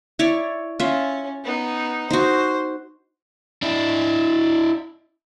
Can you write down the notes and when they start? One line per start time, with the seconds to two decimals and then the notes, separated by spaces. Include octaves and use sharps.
0.19 E4 C#5 D5
0.80 C#4 F4 E5
1.44 B3 D#4
2.10 D#4 F#4 C5
3.62 D4 E4